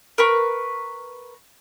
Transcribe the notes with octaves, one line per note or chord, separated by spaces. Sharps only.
A#4 B4 C#6